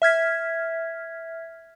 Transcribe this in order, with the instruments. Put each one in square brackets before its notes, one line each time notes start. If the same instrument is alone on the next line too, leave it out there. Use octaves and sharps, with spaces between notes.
[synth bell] E5 F6 G#6 B6